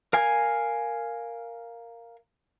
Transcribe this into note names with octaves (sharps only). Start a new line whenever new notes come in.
A#4 F5 G#5